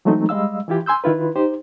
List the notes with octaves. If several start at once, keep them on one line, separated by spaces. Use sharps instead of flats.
E3 F#3 G#3 A3 C4 D#4
G3 G#3 D#5 F5 E6
E3 E4 F4 G4
G#5 C6 E6 G6
D#3 E4 F4 B4
D#4 G4 C5